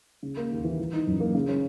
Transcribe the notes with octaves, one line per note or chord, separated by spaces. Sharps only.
C#3
A#3
D#2
E3
E3
D#4
F#2
A#3
C#3
C#4